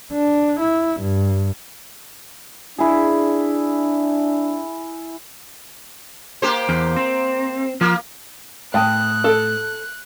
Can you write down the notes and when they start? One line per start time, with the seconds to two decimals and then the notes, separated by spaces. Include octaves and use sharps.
0.13 D4
0.60 E4
1.01 G2
2.78 D4 E4 G#4
6.42 A#3 G4 C5
6.69 E2
6.96 C4
7.81 F3 A#3
8.74 A2 G5 A5 D#6 F#6
9.24 A4